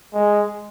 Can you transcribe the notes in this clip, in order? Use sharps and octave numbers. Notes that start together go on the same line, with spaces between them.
G#3